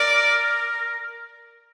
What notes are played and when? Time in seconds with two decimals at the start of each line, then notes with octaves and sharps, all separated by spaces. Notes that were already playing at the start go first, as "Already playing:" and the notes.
Already playing: A#4 D5